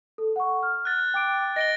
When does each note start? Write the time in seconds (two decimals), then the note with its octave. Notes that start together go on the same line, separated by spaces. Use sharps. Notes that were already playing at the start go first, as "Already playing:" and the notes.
0.18 A4
0.36 F#5 C#6
0.63 F6
0.85 F#6 A6
1.14 G5 D6 D7
1.56 D#5 A#6 D7 G7